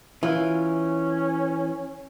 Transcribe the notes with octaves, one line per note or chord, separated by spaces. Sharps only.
E3 C#4 F4